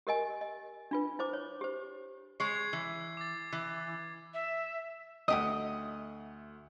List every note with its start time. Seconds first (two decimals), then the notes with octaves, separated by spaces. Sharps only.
0.07 G4 A#4 D#5 G#5
0.41 D#5
0.91 D4 F4 B4
1.19 E4 C5 D6
1.33 C#5
1.61 G4 C5
2.40 G#3 C#5 G#6 C7
2.73 E3
3.17 D6 A6
3.53 E3
4.34 E5
5.28 D2 G3 A3 G4 D#5 F#5 D#6